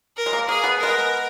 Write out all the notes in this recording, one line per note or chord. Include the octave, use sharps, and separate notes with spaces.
A#4
G#3
A#3
A#3 G#4
B3
G#3 B3 A#4